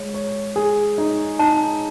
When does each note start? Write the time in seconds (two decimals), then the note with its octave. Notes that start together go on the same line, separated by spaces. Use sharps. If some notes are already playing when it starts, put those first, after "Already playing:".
Already playing: G#3 C#5
0.14 C#5
0.56 G#4
0.98 D#4
1.39 D#4 A5